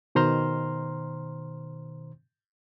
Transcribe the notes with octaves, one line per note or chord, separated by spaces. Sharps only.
B2 D#3 C5 A#5 C6 F6